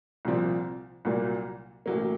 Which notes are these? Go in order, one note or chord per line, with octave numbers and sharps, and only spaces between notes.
C2 A#2 F3 C4
C2 A#2 F#3 A#3
A1 A2 F#3 A#3